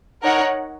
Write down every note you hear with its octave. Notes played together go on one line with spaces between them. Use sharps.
D#4 A#4 C#5 F#5